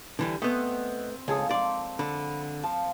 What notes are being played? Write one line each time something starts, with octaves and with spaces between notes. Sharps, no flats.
D3 E3 G3
A3 B3 C4 D#5 F#5
C#2 G#2 F3 A#3 G#4 A4 D#6
A4 D5 C6 D6
D3 B5
F3 A5